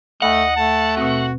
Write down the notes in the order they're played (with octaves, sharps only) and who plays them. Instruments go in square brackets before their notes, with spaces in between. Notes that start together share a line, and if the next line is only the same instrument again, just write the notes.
[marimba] D#2 B5 [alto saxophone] A3 [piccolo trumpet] D#5 [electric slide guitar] F#5
[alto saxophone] A3 [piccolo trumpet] A5
[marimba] B2 C4 [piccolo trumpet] F#4